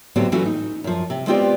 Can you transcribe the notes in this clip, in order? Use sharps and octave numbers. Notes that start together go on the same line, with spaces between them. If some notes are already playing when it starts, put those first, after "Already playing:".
A2 D3 F#3 B3 C4 G4
E3 F#3 A3 C#4 F4
D#4
F#2 F3
C3
G#3 B3 C4 F4 G4 D5